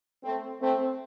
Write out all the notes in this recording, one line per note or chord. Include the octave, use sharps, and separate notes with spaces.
A3 C4
A3 C4